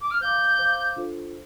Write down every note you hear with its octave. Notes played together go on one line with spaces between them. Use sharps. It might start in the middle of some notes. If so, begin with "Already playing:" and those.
D6
F6
C5 F5 D6 G6
C5 F5 D6
D4 F4 A4 C5